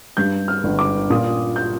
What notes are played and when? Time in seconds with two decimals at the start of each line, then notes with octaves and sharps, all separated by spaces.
0.17 G2 G6
0.48 F6
0.64 G1
0.79 D6
1.10 A#2 D#6
1.56 G6